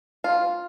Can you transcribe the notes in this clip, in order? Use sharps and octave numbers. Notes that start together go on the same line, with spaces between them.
F4